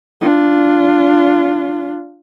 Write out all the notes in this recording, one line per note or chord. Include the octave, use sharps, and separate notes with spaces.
D4 F4